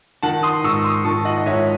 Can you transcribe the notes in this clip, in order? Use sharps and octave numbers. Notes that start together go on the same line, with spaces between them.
D#3 F#5 A5
C6 D#6
G#2 C#6 E6
C6 D#6
D#3 A5 C#6
D#5 F#5
D#5
G#2 C#5 E5